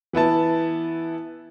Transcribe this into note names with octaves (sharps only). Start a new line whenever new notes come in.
E3 B3 E4 A5